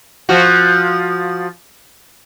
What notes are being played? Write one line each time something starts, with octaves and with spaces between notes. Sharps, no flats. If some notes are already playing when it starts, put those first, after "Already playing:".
F3 F#4